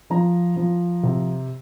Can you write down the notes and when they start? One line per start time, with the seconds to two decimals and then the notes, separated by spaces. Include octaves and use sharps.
0.10 F3 A#5
0.56 F3
1.03 C3